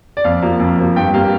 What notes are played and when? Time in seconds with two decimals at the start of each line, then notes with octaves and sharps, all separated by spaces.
0.17 D5
0.24 F2 F5
0.42 F3 A#3
0.60 F2
0.78 F3 A#3
0.96 G2 G5
1.14 G3 A#3 F5